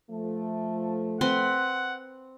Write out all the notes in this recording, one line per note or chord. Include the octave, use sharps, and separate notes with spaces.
F3 A3
C4 B4 F#5 C6